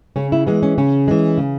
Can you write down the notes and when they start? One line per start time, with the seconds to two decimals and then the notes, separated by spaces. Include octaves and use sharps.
0.16 C#3 C#4
0.32 E4
0.47 E3 G#3 B3
0.63 C#4
0.78 C#3 C#4
1.08 E3 G#3
1.38 C#3